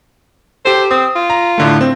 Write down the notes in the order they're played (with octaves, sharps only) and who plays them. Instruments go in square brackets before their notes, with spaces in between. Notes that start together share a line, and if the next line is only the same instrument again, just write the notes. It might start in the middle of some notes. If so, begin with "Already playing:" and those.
[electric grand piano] G4 A4 [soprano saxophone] C5
[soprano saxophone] C4 [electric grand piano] D#6
[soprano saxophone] F4
[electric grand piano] A#5
A2 D3 A3
C4